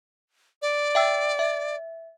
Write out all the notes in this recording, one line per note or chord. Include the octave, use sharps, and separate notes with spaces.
D5
E5 G5 E6
E5